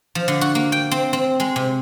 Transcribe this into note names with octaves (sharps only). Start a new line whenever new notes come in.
F3
D3
F#4
A#3
G5
C4
C4
G#3
C3